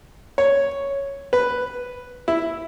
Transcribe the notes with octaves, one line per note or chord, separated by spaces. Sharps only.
C#5
B4
E4